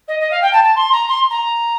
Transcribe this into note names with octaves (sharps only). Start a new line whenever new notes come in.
D#5
D#5
F5
G5
A5
A5
C6
A#5
C6
A#5